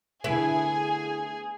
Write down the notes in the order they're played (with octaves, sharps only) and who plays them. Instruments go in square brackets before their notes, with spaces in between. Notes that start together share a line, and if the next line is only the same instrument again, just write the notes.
[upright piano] D3 A3 B3 [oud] E4 B4 [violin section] G#4 [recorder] G#5